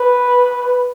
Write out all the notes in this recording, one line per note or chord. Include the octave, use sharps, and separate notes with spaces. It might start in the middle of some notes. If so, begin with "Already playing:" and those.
Already playing: B4